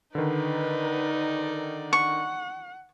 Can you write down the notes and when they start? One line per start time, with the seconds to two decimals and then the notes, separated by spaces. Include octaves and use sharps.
0.15 D3 D#3 D#4 B4 D5
1.93 F#5 C#6